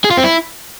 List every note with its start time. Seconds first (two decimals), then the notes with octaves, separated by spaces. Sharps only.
0.04 G#4
0.11 F4
0.17 C4
0.24 E4